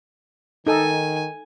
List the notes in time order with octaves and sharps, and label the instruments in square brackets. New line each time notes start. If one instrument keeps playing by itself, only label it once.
[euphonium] D#3 [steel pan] D#4 A4 [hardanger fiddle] G#5